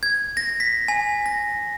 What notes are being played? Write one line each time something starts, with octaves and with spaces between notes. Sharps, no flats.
G#6
A#6
B6
G#5
A#6